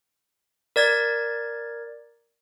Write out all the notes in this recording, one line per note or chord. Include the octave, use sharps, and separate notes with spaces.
A#4 D5 G#6 A6